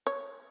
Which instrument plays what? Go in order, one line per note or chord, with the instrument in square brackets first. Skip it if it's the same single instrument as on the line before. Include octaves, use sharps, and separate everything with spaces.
[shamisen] C#5